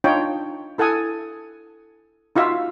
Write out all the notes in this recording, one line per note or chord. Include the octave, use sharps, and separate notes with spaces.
D4 D#4 F4 C#5 G5
E4 A4 F#5 G#5 D#6
D#4 F4 F#4 E5 F5